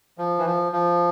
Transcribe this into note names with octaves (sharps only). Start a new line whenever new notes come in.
F3
E3
F3
F3